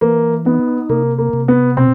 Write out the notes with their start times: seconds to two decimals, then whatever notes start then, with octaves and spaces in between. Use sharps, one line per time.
0.01 E3 A#3
0.45 B3 D#4
0.89 C3 A#3
1.18 A#3
1.33 C3
1.48 B3
1.77 B2 C4